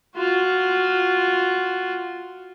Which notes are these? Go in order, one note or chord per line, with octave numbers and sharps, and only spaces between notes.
F4 F#4